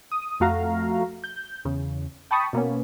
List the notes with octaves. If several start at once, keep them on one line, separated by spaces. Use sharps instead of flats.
D#6
F2 A3 F#4 F5 A#5
G6
E2 C#3
G5 A5 B5 C#6 D#6
B2 A#3 B3 C#4